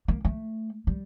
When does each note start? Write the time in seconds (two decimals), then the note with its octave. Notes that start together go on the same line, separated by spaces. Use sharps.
0.08 A#3
0.25 A3
0.87 G3